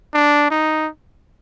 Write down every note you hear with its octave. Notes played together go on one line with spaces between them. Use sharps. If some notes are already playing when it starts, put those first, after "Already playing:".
D4
D#4